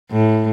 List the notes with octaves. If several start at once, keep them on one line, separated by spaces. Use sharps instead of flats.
A2